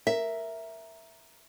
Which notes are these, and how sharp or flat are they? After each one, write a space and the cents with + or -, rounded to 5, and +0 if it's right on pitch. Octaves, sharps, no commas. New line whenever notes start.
A#4 +0 E5 +0